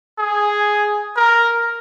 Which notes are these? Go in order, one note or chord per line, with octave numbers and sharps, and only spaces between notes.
G#4
A#4